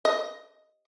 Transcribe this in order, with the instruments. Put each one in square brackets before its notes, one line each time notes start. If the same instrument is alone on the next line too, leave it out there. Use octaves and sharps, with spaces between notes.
[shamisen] D#5